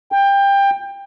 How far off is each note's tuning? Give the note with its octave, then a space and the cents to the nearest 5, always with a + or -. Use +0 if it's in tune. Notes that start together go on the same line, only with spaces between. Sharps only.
G5 +20